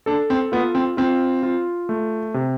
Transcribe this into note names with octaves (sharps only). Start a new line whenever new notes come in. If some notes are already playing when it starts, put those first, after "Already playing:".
D4 A4
C4
B3 F4
C4
C4 F4
F4
A3
C3